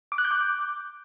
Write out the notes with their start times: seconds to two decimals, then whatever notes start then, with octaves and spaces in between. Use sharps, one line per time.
0.12 D6
0.18 F#6
0.25 G6
0.31 D6